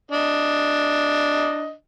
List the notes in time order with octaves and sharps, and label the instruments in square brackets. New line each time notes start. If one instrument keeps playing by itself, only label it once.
[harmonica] D4 D#5